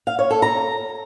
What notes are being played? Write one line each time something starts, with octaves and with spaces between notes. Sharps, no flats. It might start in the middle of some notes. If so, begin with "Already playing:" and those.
F5
C#5
A4
A#5